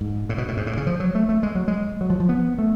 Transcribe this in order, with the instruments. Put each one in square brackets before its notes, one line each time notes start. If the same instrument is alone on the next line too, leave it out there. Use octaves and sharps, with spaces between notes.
[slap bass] G#2
A2
B2
A2
G#2
A2
C#3
F3
F#3
A3
A3
G#3
F#3
G#3
F#3
F3
F3
B3
A3